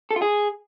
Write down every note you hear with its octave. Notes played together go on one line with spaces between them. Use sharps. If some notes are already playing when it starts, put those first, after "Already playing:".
A4
F4
G#4